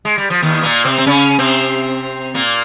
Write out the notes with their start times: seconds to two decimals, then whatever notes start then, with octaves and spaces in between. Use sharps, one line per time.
0.05 G#3
0.18 G3
0.30 F3
0.42 D#2 D#3
0.63 A#2 A#3
0.85 C3 C4
0.98 C4
1.06 C#3 C#4
1.38 C3 C4
2.34 A#2 A#3